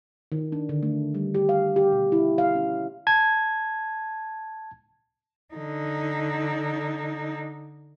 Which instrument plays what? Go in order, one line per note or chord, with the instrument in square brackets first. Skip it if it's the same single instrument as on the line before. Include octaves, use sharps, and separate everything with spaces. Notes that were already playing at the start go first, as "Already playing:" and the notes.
[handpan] D#3
D4
D3
A3
G3
G4
F5
G4
B2
E4
F5
C#4
[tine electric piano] A5 G#6
[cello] D3 D#4